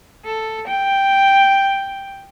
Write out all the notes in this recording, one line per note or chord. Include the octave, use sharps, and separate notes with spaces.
A4
G5